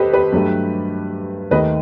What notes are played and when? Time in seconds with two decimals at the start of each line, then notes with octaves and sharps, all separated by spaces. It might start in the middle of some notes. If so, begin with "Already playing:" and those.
Already playing: D#2 G4 A4 B4 C5 D#5
0.13 G4 B4
0.32 G2 F#3 A3
1.51 D#2 D#3 A3 B4 D#5